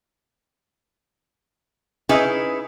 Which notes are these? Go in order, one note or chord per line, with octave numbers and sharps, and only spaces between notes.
C#4 D#4 E4 G#4 B4 E5